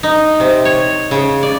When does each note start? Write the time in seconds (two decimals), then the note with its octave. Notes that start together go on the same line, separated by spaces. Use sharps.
0.03 D#4
0.40 C3
0.65 C#5
1.11 C#3
1.43 D5